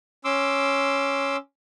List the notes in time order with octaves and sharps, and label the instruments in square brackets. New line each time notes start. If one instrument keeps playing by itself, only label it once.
[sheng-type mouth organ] C#4 C6 D6 E6